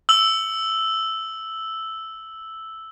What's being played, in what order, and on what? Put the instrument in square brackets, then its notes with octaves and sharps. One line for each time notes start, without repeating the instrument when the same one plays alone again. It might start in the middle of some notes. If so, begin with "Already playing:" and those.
[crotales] E6 F#7